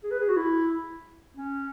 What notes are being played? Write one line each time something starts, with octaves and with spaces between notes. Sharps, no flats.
G#4
B4
G#4
F#4
E4
C#4